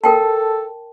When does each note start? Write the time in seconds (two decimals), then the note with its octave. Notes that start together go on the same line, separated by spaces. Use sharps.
0.04 A4 A#4 G5 A5